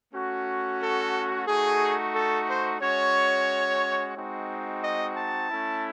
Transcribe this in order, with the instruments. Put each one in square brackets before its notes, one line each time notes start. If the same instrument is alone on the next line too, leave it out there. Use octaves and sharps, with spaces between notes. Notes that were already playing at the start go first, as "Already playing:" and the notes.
[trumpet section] A3 C#4 F#4
A4
A3 D#4 F#4 G#4
A4
C5
G#3 C#4 F#4 C#5
G#3 C4 D#4 F#4
D#5
A5
A3 C#4 E4